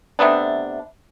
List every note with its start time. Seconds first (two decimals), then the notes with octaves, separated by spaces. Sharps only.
0.19 C3 A3 B3 D4